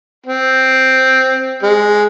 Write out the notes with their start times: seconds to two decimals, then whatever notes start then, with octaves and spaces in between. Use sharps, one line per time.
0.26 C4
1.63 G#3